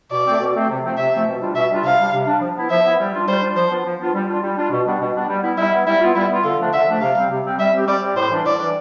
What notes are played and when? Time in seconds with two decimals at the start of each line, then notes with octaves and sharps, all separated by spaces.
0.12 B2 D5
0.26 A3 C4
0.41 B2
0.55 A3 C4
0.69 C3
0.84 F3 A3 C4
0.98 C3 E5
1.13 F3 A3 C4
1.27 B2
1.41 G3 D4 F4
1.55 B2 E5
1.71 G3 D4 F4
1.84 C3 F5
1.99 G3 D4
2.13 C3
2.27 G3 D4
2.41 F3
2.56 B3 E4
2.70 F3 E5
2.85 B3 E4
2.99 G3
3.13 D4 F4
3.28 G3 C5
3.42 D4 F4
3.56 F3 C5
3.71 B3 D4 F4
3.86 F3
4.00 B3 D4 F4
4.14 G3
4.28 D4 F4
4.43 G3
4.57 D4 F4
4.72 B2
4.86 G3 B3 D4
5.00 B2
5.15 G3 B3 D4
5.29 G3
5.43 B3 E4
5.57 G3 E4
5.73 B3 E4
5.87 G3 E4
6.01 B3 F4
6.15 G3 E4
6.29 B3 F4
6.44 D3 F4
6.58 F3 A3 D4
6.73 D3 E5
6.87 F3 A3 D4
7.01 C3 F5
7.16 G3 C4
7.30 C3
7.45 G3 C4
7.59 G3 E5
7.73 C4 G4
7.87 G3 D5
8.02 C4 G4
8.16 A2 C5
8.31 E3 G3 D4
8.45 A2 D5
8.60 E3 G3 D4